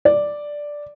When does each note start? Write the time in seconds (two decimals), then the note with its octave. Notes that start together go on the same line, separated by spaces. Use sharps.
0.05 D5